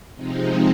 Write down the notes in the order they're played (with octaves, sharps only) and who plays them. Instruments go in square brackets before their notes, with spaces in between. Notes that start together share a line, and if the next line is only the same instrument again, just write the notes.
[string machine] C3 F3 G#3 C4 D#4